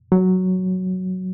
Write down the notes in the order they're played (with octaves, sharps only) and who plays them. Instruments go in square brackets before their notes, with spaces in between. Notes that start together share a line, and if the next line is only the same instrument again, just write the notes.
[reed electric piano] F#3